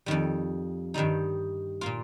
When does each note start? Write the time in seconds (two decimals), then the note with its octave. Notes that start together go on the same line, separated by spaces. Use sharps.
0.06 F2 D#3 G3
0.94 G2 D#3 G3 D#4
1.81 A#2 A#3 F4